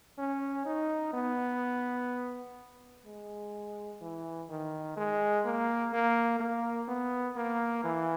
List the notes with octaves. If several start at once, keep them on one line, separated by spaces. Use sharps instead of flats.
C#4
D#4
B3
G#3
E3
D#3
G#3
A#3
A#3
A#3
B3
A#3
E3